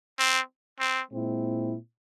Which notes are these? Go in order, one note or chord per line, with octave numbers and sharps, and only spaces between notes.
C4
C4
A#2 G#3 C4 E4